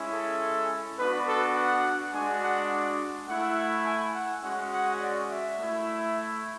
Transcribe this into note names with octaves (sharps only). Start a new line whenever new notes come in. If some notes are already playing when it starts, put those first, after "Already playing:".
Already playing: G#3 C#4 E4
A4
B3 D4 F#4 B4
A4
F#5
G#3 D4 F#4 G#5
F#5
A3 E4 F#5
G#5
F#5
G#3 C#4 F#4 F#5
F#5
D5
E5
A3 E4